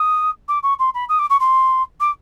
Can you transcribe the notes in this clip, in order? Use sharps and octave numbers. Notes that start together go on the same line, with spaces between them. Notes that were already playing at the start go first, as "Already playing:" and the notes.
Already playing: D#6
D6
C#6
C6
B5
D#6
D6
C#6
C6
D6